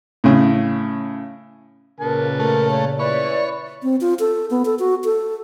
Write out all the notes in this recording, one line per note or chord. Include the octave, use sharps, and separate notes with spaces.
A2 C#3
A#2 C#3 A#4 B4 A5
A3 A#4
C#5
E4 B4 C#5 D5
C4
F4
A4
B3
A4
F#4
A4